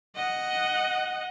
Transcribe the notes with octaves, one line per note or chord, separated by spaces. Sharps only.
D#5 F#5